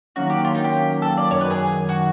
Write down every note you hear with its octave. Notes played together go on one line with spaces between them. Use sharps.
D#3 F#3 A#3 C#4 F#4
G4
F4
D#4
G4
A4
D5
F#2 D#3 F#3 C#5
B4
G#4
F#4